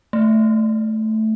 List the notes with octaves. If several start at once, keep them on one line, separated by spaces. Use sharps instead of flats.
A3